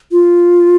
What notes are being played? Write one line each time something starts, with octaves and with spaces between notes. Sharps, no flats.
F4